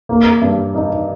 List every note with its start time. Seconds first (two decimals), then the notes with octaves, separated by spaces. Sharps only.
0.09 A#3
0.42 G2
0.75 D#4